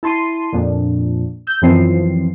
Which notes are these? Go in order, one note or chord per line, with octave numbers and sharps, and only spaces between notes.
E4 A5 C6 C7 D#7
F2 A#2 F3 D4
E6 G6
F#2 E3 F3 C4 C7